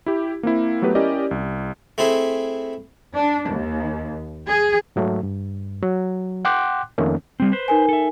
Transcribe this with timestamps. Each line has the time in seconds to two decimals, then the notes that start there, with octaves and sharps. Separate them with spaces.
0.06 E4 G4
0.43 A#3 C4 E4
0.82 F#3 A3 B3 G4 B4
0.95 C#4 E4 G4 A#4 D5 D#5
1.31 C2
1.98 A3 C4 E4 G#4
3.15 D4
3.47 D#2
4.47 G#4
4.96 G#2 F#3 A3
5.23 G2
5.83 F#3
6.45 F#5 G5 C6 D6 F#6
6.98 F2 D#3 A3 A#3 C#4
7.40 G3 C4
7.52 B4 C5
7.68 D#4 A#4 G#5
7.89 A4 E5